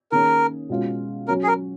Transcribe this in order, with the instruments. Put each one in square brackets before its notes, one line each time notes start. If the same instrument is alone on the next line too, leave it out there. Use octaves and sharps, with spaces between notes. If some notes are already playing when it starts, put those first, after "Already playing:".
[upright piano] D#3 A#3 C#4 G#4 [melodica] A#4
[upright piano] B2 G#3 C#4 F4
[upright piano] F#3 C#4 F#4 [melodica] A#4
[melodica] G#4
A#4